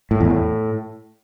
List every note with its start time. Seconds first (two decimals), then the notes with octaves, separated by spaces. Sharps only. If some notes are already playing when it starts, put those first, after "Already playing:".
0.11 A2
0.21 E2
0.30 A2